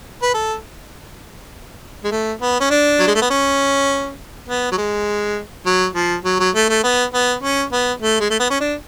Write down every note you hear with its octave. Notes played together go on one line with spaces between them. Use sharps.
B4
A4
G#3
A3
B3
C#4
D4
F#3
G#3
A3
B3
C#4
B3
F#3
G#3
F#3
F3
F#3
F#3
A3
A3
B3
B3
C#4
B3
A3
G#3
A3
B3
C#4
D4